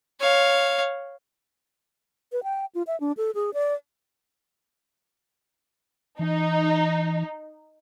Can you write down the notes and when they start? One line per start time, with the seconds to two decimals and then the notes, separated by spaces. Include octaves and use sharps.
0.20 C#5 F5
2.32 B4
2.43 G5
2.75 F4
2.87 E5
3.00 D4
3.17 A4
3.35 G#4
3.54 D5
6.19 E3 D#4